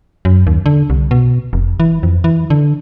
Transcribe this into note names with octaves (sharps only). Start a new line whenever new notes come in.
F#2
D#2
D3
C2
B2
F1
E3
F2
E3
D3